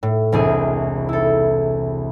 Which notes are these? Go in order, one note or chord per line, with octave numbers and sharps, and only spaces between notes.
A2
E1 C2 G#4 D#6
E4 A4